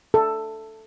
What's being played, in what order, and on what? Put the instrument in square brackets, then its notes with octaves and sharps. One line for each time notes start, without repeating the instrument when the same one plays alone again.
[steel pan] A4